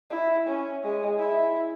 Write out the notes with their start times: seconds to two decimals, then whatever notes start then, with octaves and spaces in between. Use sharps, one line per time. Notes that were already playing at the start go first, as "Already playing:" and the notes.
0.11 E4
0.47 C#4
0.84 G#3
1.19 E4